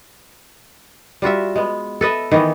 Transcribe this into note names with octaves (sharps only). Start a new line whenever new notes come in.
G3 F4 F#4 E5
G#3 B3
A4 B4 D#5 E5
D#3 E3 B3